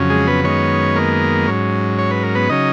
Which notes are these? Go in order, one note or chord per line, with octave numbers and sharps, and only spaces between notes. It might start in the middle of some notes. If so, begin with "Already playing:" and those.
Already playing: F2 C#3 F#3 C#4
G#3 G#4
B3 B4
F#2 D#3 G#3 B3 C#4 C#5
A#3 A#4
G#2 F#3 C#4
C#5
B4
A#4
B3 B4
C#3 F#3 C#4 D#4 D#5